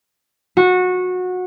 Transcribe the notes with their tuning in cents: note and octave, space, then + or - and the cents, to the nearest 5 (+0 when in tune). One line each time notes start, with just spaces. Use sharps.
F#4 -20